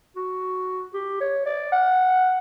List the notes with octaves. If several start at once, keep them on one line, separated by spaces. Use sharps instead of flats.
F#4
G4
C#5
D5
F#5